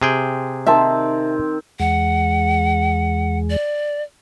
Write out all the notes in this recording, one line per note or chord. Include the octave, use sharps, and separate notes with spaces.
C3 G#4 G5
D#3 C4 E5 A5
E2 G#3 F#5
D5